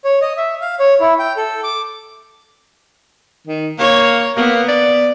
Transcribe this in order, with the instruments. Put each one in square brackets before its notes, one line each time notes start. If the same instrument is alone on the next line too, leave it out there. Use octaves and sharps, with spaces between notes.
[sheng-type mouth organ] C#5
D#5
E5
F5
C#5
E4
G5
A4
D6
[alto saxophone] D#3
[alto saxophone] A#3 [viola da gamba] C#5
[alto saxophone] A#3 [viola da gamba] B3
[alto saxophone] D5